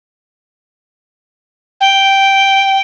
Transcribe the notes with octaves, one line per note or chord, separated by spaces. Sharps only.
G5